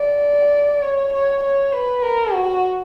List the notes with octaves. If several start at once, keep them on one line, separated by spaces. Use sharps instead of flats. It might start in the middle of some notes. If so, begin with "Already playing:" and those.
Already playing: D5
C#5
C#5
C#5
B4
A#4
F#4